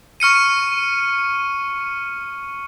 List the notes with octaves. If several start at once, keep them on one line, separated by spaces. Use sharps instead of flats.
C#6 F6 C#7 D#7